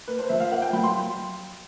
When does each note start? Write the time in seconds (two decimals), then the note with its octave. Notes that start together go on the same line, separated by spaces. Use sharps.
0.08 A#3 B4
0.19 C5
0.29 F3 E5
0.40 F5
0.51 A#3 F#5
0.62 G5
0.73 F#3 B5
0.84 C6